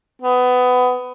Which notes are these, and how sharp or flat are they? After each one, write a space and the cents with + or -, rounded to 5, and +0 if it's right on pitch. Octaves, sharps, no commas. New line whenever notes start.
B3 +20